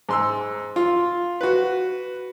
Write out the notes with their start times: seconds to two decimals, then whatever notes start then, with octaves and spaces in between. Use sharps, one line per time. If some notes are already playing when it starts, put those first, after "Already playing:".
0.09 G#2 C6 E6
0.76 F4
1.41 F#4 B4